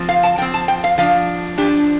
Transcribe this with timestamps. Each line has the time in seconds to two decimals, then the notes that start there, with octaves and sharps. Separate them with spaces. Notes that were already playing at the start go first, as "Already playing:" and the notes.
Already playing: F3 C4
0.09 F5
0.23 A5
0.38 F3 G5
0.42 C4
0.54 A5
0.68 G5
0.84 F5
0.98 F3 D4 F5
1.58 F3 D4 G4